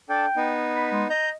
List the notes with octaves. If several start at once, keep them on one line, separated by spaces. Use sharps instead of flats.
D4 A4 G5
B3 D#4
B5
G#3
D#5 A#5 G6